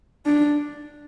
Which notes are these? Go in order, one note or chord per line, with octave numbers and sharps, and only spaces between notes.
D4